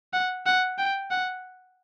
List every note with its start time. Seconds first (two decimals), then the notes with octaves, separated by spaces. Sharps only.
0.13 F#5
0.46 F#5
0.78 G5
1.11 F#5